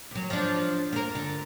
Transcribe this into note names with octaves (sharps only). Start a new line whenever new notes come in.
D#2 F#3
F3 D4
A#3 A#4
D3